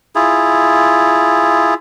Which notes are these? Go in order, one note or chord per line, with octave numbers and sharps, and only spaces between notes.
E4 F4 G#4